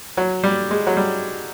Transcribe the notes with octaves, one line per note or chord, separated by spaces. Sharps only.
F#3
G3
G#3
F#3
G3